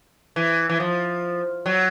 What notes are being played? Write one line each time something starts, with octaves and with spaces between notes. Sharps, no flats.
E3
E3
F3
F#3